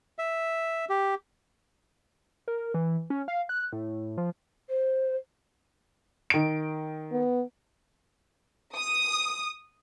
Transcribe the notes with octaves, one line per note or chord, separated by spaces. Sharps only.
E5
G4
A#4
E3
C#4
F5
F#6
A2
F3
C5
D#3 D7
B3
D#6